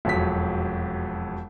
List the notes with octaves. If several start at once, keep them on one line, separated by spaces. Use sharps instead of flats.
E1 F2 F#3 B6